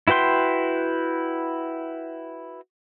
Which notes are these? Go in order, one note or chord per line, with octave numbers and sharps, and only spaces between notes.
E4 F#4 B4 G5 C6